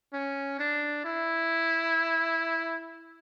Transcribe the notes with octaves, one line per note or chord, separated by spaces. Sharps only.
C#4
D4
E4